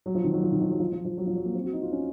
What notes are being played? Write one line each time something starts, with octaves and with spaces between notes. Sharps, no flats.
F#3
F3
D#3
F#3
F3
D#3
F3
F#3
F3
F3
F3
F#3
F3
F#3
A#3
C4
F#4
D#4
F4
C#4